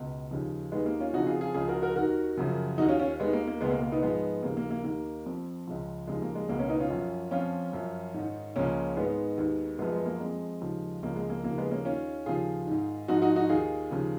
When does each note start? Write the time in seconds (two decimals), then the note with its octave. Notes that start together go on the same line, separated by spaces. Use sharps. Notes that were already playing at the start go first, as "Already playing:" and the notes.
Already playing: C#2 B2
0.31 D#2 C#3 F3
0.72 D#2 D#3 G#3 B3
0.86 A#3
1.00 C#4 F4
1.13 F2 C#3 F3 D#4 F#4
1.27 F4 G#4
1.41 F4 G#4
1.54 C#2 C#3 F3 F4 G#4
1.69 F#4 A#4
1.82 F#4 A#4
1.96 D#2 D#3 F#4 A#4
2.37 F#2 C#3 F3
2.78 D#2 D#3 D#4 F#4
2.89 C#4 F4
2.99 C#4 F4
3.20 D#2 D#3 G#3 B3
3.33 A#3
3.47 A#3
3.61 C#2 B2 G#3 B3
3.71 A#3
3.82 A#3
3.92 B3 D#4
4.02 G#2 F3 G#3 B3
4.43 D#2 C#3 F3 A#3
4.57 A#3
4.70 A#3
4.84 D#2 D#3 A#3
5.26 F2 F3
5.67 C#2 C#3 F3
6.08 D#2 C#3 F3 G#3
6.22 A#3
6.35 G#3
6.49 C#2 B2 A#3
6.59 A#3 C#4
6.69 B3 D#4
6.80 C#4 F4
6.90 F#2 F3
7.31 F2 F3 C#4 F4
7.73 F#2 F3
8.14 G#2 D#3
8.56 C#2 C#3 F3 A#3 C#4
8.97 G#2 D#3 G#3 B3
9.38 D#2 D#3
9.79 F#2 F3 G#3 B3
9.92 G#3 B3
10.06 A#3
10.20 F2 F3 G#3
10.61 D#2 C#3 F3
11.02 C#2 C#3 F3 A#3
11.16 G#3
11.30 A#3
11.43 D#2 C#3 F3 A#3
11.58 G#3 B3
11.71 A#3 C#4
11.85 D#2 D#3 C#4 F4
12.26 D#2 C#3 F3 F4 G#4
12.67 G#2 D#3
13.08 G#2 F3 D#4 F#4
13.22 D#4 F#4
13.36 D#4 F#4
13.49 D#2 D#3 F4 G#4
13.91 D#2 C#3 F3